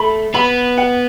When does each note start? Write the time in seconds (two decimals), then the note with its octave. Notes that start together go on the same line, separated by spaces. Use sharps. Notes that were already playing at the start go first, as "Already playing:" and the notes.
Already playing: A3 B5
0.34 B3 B5
0.77 F#5